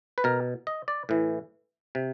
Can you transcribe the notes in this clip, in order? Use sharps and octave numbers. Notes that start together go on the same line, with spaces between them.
B4
B2 A#4
D#5
D5
A2 E3
C3